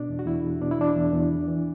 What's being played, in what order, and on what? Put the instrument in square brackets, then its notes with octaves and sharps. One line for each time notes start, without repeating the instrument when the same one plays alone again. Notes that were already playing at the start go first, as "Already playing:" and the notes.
Already playing: [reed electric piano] B2 D4
E2
F#4
E2 E4
E2
B2 D4
E4
E2 D4
E2
E2
E3
E3